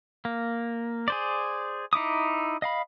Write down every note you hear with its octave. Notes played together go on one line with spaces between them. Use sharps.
A#3
G#4 C5 D5
D#4 E4 D6 D#6
D#5 F5 B5